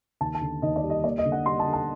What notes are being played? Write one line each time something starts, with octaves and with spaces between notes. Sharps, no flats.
D#2 A5
A5
D3
D#2 D#5
D5
G3
D#5
A#3 D5
D#5
D3
F#5
G3 C6
A5
D3
A5